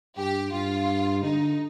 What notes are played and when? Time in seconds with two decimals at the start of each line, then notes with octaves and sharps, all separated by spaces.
0.17 G2 G4
0.52 G2 F4
1.23 D3 D#4